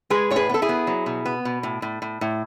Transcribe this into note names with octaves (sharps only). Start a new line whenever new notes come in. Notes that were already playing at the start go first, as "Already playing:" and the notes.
G#3 G#4 B4
A2 C#5
G#4 B4
B3 A4
E4 G#4
B3
F#3
B2
B3
B2
A2
A2
A2
A2